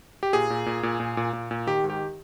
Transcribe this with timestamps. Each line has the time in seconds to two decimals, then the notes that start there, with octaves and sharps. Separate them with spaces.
0.23 G4
0.33 A#2 G#4
0.50 A#2
0.66 A#2
0.83 A#2
1.00 A#2
1.17 A#2
1.33 A#2
1.51 A#2
1.67 D#3 G4
1.84 G#2
1.90 G4